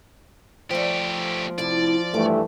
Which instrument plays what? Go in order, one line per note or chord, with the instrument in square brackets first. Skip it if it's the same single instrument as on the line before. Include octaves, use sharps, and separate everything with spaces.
[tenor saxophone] F3 [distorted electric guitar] A3 G4 [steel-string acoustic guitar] C5 D5
[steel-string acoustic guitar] A2 C3 E4 [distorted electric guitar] D5
[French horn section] G2 E3 A3 [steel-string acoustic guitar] D3